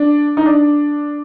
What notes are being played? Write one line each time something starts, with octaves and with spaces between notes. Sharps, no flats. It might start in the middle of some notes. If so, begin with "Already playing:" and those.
Already playing: D4
D#4
D4